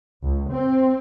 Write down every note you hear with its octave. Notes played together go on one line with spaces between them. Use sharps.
C#2
C4